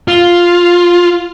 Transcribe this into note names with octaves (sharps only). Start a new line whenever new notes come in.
F4